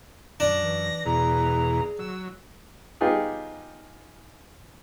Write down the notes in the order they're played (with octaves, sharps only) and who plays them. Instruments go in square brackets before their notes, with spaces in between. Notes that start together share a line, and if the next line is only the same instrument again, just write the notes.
[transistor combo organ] F#2 [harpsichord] D4 [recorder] A#6
[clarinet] E3
[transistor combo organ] E2 B2 E3 [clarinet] G#4 [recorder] A#5
[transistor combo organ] F#3 [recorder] E6
[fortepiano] G3 B3 D#4 F4 G4 G#4